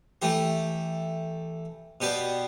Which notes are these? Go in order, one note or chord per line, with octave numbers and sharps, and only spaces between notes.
E3 A3 G4
B2 B3 G4 D5